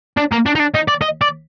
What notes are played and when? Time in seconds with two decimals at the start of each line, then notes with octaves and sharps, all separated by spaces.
0.17 D4
0.32 A#3
0.46 D4
0.55 D#4
0.59 D4
0.75 D#4
0.88 D5
1.02 D#5
1.21 D5